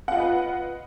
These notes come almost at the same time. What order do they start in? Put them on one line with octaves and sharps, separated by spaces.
F#5 F4 D#5 B4